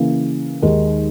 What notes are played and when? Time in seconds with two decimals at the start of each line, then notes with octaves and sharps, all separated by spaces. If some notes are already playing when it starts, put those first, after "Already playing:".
Already playing: C#3 E3 A#3
0.62 D#2 D#3 G#3